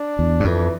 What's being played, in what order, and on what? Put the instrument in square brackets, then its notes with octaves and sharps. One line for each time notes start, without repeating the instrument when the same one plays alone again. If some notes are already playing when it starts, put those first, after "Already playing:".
Already playing: [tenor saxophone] D4
[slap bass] E2
G2
[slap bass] F2 [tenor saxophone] E3